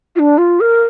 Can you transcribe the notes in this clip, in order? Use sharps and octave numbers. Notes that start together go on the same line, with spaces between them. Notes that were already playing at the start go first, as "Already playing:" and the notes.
F4
D4
F4
A#4